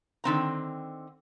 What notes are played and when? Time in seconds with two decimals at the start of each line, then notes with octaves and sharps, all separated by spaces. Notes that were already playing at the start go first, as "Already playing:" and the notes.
0.24 D3 D#3 C4 A#5